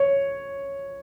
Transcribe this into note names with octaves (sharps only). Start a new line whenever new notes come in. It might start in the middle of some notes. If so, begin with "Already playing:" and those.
Already playing: C#5